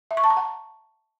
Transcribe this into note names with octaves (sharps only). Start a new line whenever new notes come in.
E5
C#6
A5
A#5
F#5